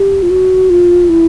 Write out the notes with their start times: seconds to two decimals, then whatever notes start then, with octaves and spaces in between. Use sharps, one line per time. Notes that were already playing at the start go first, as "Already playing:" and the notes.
Already playing: G4
0.23 F4
0.30 F#4
0.70 F4
1.09 E4